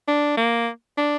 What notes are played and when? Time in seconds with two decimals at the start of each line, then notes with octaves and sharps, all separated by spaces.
0.08 D4
0.37 A#3
0.98 D4